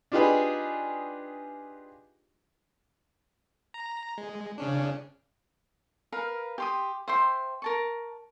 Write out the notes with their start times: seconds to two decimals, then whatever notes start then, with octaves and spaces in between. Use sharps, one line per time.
0.12 D4 D#4 F4 G4 G#4 B4
3.74 A#5
4.18 G#3
4.58 C#3 C#4 D4
6.12 A#4 B4 F5
6.58 G4 C6 D#6
7.08 C5 E5 G5 C6
7.62 A#4 A5 C#6